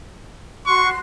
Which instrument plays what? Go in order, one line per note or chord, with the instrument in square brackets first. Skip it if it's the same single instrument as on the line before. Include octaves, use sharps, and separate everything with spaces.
[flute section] F#4 C6 F#6 [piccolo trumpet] C#6